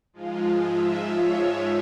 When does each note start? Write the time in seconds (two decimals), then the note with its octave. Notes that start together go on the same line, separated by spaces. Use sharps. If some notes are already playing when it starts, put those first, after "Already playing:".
0.13 G#2 F3 G#3 F4
0.60 E5
1.06 C#5